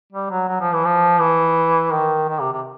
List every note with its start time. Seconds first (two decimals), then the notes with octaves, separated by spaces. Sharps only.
0.12 G3
0.30 F#3
0.48 F#3
0.61 F3
0.73 E3
0.85 F3
1.20 E3
1.93 D#3
2.28 D#3
2.40 C3
2.52 C3